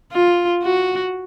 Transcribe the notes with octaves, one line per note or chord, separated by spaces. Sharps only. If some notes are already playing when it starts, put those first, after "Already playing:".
F4
F#4